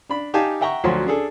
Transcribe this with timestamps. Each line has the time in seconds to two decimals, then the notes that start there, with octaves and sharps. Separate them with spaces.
0.10 D4 B5
0.34 D#4 G4 F5 G#5 A5
0.61 E5 F#5 G5 A#5 C#6
0.84 D2 F3 F#3 C#5 C6
1.06 D4 G#4 A4